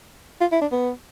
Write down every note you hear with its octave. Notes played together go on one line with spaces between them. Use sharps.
F4
E4
D4
B3